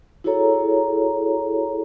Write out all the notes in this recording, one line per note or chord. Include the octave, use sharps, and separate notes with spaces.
E4 F#4 G#4 A4 C#5 A#5